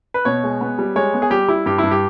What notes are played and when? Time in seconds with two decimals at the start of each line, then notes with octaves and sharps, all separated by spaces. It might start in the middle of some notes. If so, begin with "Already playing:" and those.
0.14 B4
0.25 B2 C#5
0.44 G#3
0.61 B3
0.79 G3
0.96 G#3 C#5
1.14 B3
1.22 G#4
1.30 G3 G4
1.48 G3 E4
1.66 G2 G4
1.78 E4
1.83 G2
1.91 G4